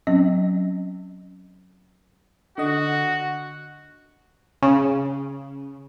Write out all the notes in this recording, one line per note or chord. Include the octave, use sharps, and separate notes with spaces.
F#3 C4 C#4 D#5
D3 F#4 D#5
C#3